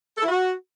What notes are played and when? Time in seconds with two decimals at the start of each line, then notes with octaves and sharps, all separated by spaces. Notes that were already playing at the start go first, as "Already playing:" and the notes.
0.18 A4
0.23 E4
0.28 F#4